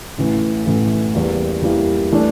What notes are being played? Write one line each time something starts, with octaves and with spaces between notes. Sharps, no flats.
A1 A2 E3 A3 E4
A1 A2 E3 A3 E4
E2 E3 G3 A#3 E4
E2 E3 G3 A#3 E4
E3 A3 D4